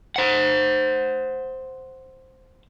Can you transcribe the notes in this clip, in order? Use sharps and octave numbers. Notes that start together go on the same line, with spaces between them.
C5 F#5